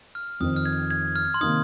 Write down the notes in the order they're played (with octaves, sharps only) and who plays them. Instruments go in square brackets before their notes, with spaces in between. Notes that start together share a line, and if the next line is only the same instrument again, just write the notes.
[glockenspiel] F6
[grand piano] F2 D#3 C4 [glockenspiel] D#6
[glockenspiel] F6
G#6
G#6
F6
C6
[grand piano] C3 D#3 A#3 D#4 [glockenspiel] D#6